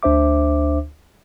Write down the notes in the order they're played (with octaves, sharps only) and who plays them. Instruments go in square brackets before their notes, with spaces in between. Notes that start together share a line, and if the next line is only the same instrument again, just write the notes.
[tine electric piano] D2 D4 C5 E5 D6